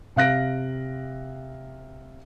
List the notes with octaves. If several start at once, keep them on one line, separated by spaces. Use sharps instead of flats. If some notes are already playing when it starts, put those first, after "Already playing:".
C3 F5 F#6 A#6 D7